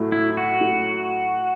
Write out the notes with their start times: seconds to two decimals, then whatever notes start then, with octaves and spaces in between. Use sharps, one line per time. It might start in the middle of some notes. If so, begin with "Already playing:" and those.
Already playing: A2 F#3 A3
0.12 E4
0.37 F#4
0.61 A2 F#3 A3